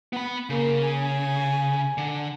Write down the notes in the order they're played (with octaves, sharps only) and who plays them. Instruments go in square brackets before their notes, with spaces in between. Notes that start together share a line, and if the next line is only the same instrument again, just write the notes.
[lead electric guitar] B3 B5
[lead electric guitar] C#3 [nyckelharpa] A#3
[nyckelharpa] G#5
[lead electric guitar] D3